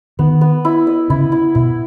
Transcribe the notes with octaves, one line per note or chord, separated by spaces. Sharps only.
D#3 B3
B3
E4
D#5
C#3 E4
E4
B2 E4